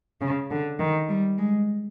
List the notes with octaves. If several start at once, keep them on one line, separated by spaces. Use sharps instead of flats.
C#3
D3
D#3
G3
G#3